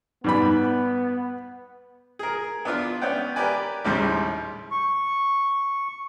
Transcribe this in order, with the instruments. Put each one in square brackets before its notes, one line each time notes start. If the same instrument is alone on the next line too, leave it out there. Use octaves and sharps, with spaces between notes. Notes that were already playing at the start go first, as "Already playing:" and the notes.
[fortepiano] G#2 G3 B5 [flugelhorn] B3
[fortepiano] G#4 A#4
B3 D4 F4
B3 C#4 D5 F#5 G5
G4 A#4 B4 D5 G#5
A#1 D#2 A2 C#3 G3 C5
[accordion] C#6